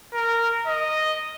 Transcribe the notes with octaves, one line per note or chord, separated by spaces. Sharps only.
A#4
D#5